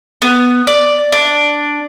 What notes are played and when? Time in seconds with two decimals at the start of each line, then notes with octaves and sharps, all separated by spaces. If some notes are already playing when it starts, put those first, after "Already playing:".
0.22 B3
0.67 D5
1.12 D4